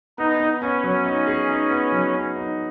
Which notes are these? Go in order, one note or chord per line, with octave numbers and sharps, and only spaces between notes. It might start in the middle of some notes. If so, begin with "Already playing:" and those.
B3 D#4
B3
B3 C#4
F#3
D#4
G#4
D#4
B3
F#3
B3
D#4